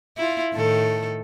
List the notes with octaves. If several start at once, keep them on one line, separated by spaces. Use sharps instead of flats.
E4 F4
A2 D#3 A4